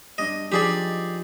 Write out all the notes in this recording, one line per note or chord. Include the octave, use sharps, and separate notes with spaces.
G2 D4 D#5
F3 D4 D#4 G4 G#4 D5